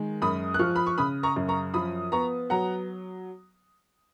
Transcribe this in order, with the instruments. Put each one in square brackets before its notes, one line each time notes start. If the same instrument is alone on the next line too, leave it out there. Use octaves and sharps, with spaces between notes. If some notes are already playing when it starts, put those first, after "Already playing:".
Already playing: [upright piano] D#3 G#3
F#2 B5 D#6
F#6
F3 C#6 F6
B5
C#6
C#3 B5 D#6
A#5 C#6
F#2
A#5 C#6
F3 B5 D#6
B3 A#5 C#6
F#3 F#5 A#5